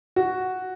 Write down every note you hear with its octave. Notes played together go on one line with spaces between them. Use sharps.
F#4